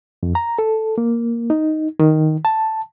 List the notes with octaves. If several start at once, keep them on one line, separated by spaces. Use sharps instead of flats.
F2
A#5
A4
A#3
D#4
D#3
A5